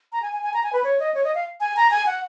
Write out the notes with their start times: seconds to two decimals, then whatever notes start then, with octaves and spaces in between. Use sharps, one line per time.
0.12 A#5
0.22 G#5
0.33 G#5
0.43 G#5
0.53 A#5
0.63 G#5
0.73 B4
0.84 C#5
1.00 D#5
1.14 C#5
1.24 D#5
1.35 F5
1.60 G#5
1.76 A#5
1.91 G#5
2.06 F#5